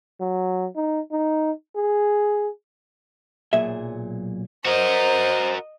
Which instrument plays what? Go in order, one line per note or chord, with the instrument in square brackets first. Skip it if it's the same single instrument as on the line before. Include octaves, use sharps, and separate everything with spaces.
[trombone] F#3
D#4
D#4
G#4
[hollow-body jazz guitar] B1 A#2 F#3 G#4 E5
[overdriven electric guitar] F#4 A#4 [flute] C5 [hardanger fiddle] D#5